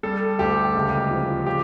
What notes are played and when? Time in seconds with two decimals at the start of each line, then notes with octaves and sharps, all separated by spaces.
0.03 G3 A4
0.39 D2 G4
0.75 C#2
1.11 F3
1.46 G4